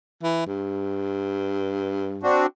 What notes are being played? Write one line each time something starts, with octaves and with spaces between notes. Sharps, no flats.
E3
G2
C4 D4 F#4